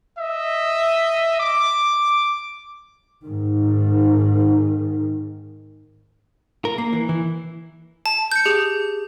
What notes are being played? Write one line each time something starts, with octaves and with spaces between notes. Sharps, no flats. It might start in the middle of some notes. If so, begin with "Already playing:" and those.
D#5 E5
D6
G#2 D#3
A#4
A#3
E3
E3
A5
G6 C#7
G4 G#4